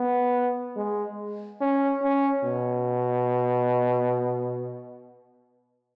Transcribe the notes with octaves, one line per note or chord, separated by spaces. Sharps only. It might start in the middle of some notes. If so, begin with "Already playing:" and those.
Already playing: B3
G#3
C#4
C#4
B2